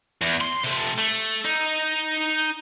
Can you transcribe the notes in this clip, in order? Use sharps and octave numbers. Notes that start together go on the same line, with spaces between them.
E2
C6
C3 A3
A3
D#4